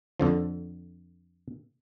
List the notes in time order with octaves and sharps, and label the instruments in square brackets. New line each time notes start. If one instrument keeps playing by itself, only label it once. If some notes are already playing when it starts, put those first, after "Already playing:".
[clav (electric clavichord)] F2 D3 F3